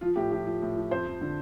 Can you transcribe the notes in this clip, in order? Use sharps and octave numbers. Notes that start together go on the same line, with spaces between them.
F3 F4
A2 G4
F3 G4
F3
A2
F3
F2 C5
F2
D3